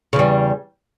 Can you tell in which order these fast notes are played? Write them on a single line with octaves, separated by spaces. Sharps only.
C#3 E2 G3